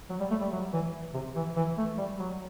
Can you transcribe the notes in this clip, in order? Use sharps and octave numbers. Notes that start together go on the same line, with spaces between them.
F#3
G3
A3
G3
F#3
E3
C3
E3
E3
A3
G3
F#3